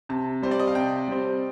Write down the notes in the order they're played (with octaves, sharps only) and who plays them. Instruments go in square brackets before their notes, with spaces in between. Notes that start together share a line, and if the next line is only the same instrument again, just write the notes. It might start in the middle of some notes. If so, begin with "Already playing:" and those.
[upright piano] C3 [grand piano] A5
[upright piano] G3 C4 [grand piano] C5
[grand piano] D5
D#5
F5
[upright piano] C3 [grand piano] G5
[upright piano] G3 C4